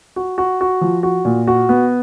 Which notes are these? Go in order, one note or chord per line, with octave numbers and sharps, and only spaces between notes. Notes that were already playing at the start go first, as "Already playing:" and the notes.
F#4
F#4
F#4
F3
F#4
A#2
F#4
B3